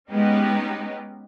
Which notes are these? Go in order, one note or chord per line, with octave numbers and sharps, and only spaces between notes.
G#3 B3 C#4 D#4 G4